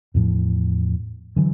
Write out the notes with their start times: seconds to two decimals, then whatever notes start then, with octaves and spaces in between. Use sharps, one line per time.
0.14 E2 A2 F3
1.36 D3 E3 F#3